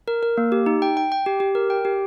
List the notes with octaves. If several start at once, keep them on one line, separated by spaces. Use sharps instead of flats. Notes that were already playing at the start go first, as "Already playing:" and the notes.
A#4
A#4
A#3
G4
D#4
G5
G5
G5
G4
G4
A#4
G5
G4